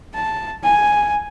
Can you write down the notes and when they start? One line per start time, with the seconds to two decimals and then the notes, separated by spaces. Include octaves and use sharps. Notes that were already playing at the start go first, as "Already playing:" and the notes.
0.15 A5
0.64 G#5